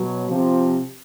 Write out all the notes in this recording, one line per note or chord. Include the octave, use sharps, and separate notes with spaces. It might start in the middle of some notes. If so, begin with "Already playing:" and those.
Already playing: B2 F#3
C3 F3